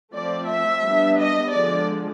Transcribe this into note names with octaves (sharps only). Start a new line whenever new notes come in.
F3 A3 C4 D5
E5
G3 B3 D4
D#5
D3 F3 G#3 D5